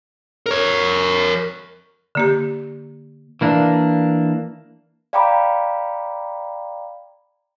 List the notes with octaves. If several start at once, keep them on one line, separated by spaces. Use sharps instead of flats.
A#4 C#5
D3 A#3 G4
E3 A#3 D4
D5 F5 G5 A#5 B5 D6